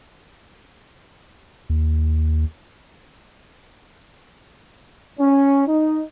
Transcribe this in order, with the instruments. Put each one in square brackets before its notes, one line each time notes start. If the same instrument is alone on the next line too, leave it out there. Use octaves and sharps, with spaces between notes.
[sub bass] D#2
[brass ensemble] C#4
D#4